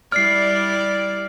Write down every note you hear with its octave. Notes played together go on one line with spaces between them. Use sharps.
G3 E4 D5 F6 C7